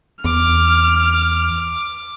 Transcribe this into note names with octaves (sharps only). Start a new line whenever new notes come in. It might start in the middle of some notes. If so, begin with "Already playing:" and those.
E2 D6 F6